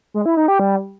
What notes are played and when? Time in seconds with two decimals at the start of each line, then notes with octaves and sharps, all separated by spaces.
0.14 G#3
0.26 E4
0.37 D#4
0.48 G4
0.60 G3